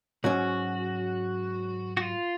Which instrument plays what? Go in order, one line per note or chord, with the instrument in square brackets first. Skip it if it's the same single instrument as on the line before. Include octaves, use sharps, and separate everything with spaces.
[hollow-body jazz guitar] G#2 F#3 C#4 [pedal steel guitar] F#4
[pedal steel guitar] F#4
F4